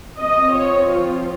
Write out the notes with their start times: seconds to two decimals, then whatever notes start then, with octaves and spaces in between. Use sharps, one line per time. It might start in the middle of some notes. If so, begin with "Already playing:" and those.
0.19 F3 C4 D#5
0.53 C#5
0.88 F4